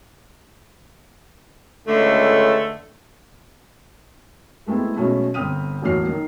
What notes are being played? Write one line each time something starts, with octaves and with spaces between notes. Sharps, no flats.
C#2 D3 A3
G#3 A3 B3 C4 E4
B2 F#3 G#3 A3 C#4
G1 C4 D#6 F6 D#7
D#1 A1 E2 F#4 F6 C7
D#3